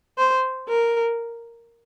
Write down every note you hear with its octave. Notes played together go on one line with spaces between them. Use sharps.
C5
A#4